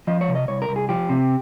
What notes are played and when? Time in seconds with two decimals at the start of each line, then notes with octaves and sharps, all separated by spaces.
0.07 F3 D#5
0.21 C#5
0.29 C3
0.35 D#5
0.48 C2 C#5
0.62 A#4
0.69 C2
0.76 G#4
0.89 F3 G4
1.09 C3